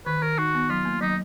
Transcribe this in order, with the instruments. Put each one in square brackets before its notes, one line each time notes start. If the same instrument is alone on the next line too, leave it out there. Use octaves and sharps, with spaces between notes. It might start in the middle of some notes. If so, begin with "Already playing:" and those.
[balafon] D#3 [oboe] B4
[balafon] D#3 [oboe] A#4
[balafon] D#4 [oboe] F#4
[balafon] B3
[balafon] F#3 [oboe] F4
[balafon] A#3
[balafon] F#3 [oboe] D#4